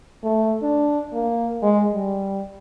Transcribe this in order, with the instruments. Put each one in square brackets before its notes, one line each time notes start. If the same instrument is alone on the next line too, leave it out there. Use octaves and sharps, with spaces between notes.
[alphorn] A3
D4
A#3
G#3
G3